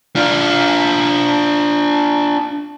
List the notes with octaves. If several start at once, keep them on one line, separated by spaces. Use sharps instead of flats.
D4 F4